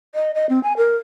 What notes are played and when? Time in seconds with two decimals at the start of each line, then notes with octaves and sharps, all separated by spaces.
0.15 D#5
0.35 D#5
0.49 C4
0.63 G#5
0.77 A#4